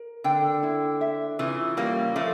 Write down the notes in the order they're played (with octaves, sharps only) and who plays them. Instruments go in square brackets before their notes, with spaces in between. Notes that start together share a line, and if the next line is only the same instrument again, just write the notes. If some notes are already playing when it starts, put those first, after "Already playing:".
Already playing: [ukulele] A#4
[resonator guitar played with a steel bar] D3 [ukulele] G5
[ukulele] E4
E5
[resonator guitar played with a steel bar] C#3 E3 [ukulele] F4
[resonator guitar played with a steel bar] G3 A#3 [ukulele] C#4
[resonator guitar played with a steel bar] F3 A3 [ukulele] C#4